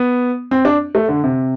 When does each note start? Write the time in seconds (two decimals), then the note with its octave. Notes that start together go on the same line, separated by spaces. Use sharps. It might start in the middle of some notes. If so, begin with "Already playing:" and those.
Already playing: B3
0.51 C4
0.65 D4
0.95 A3
1.08 D3
1.24 C3